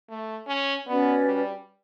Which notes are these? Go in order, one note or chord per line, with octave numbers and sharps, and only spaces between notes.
A3
C#4
B3 C#4 F#4 B4 D5
G3